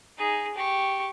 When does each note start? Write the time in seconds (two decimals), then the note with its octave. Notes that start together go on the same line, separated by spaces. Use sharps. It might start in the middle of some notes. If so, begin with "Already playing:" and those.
0.18 D#4 G#4
0.55 G4 C#6